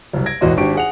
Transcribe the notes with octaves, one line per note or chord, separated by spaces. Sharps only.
F#1 C2
G#6 A#6 D7
E1 A1 E2 F#4 D#5 C6
G#1 D4 G4 C#6 D7
G#4 F#5 F7